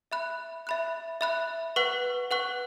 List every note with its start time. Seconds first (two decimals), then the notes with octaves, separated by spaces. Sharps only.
0.12 E5 B5 F#6
0.67 E5 B5 F#6
1.21 E5 B5 F#6
1.76 B4 F#5 C#6 F#6
2.31 B4 F#5 C#6 F#6